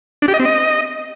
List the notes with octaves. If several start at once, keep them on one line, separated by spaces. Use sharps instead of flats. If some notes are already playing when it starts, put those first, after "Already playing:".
D4
G4
D#5
C4
D#5